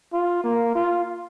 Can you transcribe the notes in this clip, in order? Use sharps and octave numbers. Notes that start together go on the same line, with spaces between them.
F4
A#3
F4